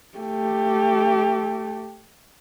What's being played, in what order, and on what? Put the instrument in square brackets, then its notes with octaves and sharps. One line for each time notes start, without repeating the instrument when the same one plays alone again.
[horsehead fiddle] A3 G4